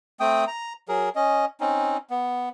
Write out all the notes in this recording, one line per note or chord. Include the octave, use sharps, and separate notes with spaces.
A3 C4 G5 D#6
A#5
F#3 G#4 A#4
C#4 D#5
C4 C#4 D#4
B3